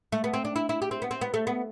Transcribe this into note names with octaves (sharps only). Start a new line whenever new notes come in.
A3
B3
C4
D4
E4
E4
G4
C4
B3
C4
B3
A3
B3